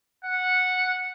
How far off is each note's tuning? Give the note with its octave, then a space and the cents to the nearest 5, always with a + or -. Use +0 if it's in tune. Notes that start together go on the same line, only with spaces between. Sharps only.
F#5 -10